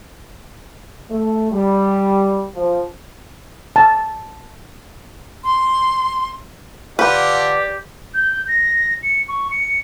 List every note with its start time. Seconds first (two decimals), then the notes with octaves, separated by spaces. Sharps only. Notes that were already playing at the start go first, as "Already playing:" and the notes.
1.10 A3
1.51 G3
2.55 F3
3.76 A5
5.44 C6
6.99 D3 F4 G4 B4 D5 F#5
8.14 G6
8.48 A#6
9.03 C#7
9.28 C#6
9.51 C#7